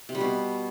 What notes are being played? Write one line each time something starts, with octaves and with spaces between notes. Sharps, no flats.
C3
G3
B2